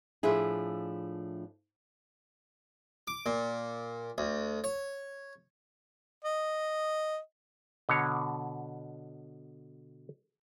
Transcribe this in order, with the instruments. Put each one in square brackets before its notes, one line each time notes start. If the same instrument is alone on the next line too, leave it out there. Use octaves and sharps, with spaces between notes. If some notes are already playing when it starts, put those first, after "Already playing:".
[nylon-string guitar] A2 F3 D4 E4 F4 G#4
[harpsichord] D6
A#2
D2
C#5
[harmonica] D#5
[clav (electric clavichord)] B2 D3 C#5